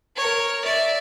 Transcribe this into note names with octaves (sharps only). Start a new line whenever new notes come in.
A#4 C#5
D5 E5